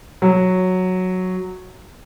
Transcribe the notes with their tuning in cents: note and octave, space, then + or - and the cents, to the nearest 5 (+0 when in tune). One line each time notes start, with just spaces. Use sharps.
F#3 -5